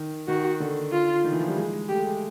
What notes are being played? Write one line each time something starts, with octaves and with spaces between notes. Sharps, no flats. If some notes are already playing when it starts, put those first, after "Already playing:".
Already playing: D#3
D#3 F#4
D3
F4
D#3
E3
F3
G3
G#3
G#3
A3 G4
G#3